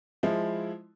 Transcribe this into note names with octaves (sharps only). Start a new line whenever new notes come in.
F3 G#3 E4